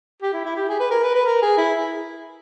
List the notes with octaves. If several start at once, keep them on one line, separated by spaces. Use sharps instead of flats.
G4
E4
E4
G4
G#4
B4
A#4
B4
B4
A#4
G#4
E4